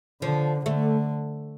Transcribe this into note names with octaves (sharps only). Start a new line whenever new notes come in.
D3 F3
D3 A3